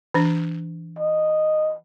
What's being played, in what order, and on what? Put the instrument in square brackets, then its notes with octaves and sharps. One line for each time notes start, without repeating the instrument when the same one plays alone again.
[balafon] E3 D4
[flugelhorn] D#5